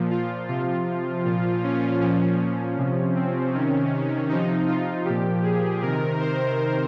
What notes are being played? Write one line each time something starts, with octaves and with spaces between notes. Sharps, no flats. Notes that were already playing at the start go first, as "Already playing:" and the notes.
Already playing: A#2 F3
F4
C3 F3 F4
A#2 F3 F4
C#4
A#2 F3 C#4
C3 F3
C4
C3 D#3 C#4
C3 F3 D#4
F4
A#2 F3 G4
G#4
C3 D#3 A#4
C5